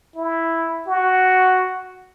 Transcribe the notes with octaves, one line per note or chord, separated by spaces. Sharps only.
E4
F#4